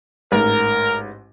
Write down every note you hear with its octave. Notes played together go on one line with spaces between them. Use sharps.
A1 G#2 A#4